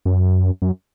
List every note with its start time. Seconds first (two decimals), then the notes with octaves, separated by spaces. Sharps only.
0.05 F#2
0.62 F#2